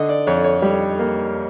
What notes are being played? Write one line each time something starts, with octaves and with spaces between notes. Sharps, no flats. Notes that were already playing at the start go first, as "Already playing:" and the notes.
Already playing: D3 D#5
D5
F2 C#5
C#5
G3
A#3